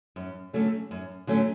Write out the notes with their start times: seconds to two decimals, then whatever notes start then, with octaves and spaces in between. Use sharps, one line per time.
0.16 F#2
0.53 D3 F#3 A3 C#4
0.91 F#2
1.27 D3 F#3 A3 C#4